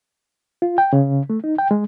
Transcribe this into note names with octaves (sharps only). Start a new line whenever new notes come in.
F4
G5
C#3
A3
D#4
G5
G#3